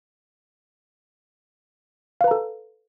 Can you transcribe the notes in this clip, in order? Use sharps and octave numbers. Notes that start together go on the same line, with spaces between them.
A4 B4 F5 A#5